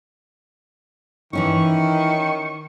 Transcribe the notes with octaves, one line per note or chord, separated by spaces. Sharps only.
D#3 E3 C#4 E4 C#6